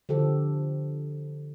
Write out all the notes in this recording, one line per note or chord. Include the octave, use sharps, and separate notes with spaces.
D3 F3 G4 A4